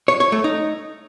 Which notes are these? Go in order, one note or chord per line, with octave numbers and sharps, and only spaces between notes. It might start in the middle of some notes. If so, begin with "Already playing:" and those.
C#5
C#5
A3
D#4